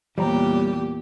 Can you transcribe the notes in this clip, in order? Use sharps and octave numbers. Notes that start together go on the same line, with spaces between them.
E2 A#2 G3 G4 C#5 A#5